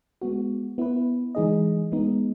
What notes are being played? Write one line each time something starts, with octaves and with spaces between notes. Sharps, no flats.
G#3 B3 F#4
B3 E4 B4
E3 G#3 D#4 G#4 D#5
G#3 B3 D#4